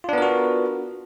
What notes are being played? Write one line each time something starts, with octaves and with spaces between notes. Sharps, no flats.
B3 D4 F4 F#4 A#4